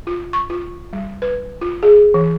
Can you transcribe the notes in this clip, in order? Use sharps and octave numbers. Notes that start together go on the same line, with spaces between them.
F4
C#6
F4
G3
B4
F4
G#4
E3